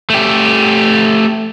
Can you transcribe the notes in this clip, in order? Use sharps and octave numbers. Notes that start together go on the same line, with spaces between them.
A3 G4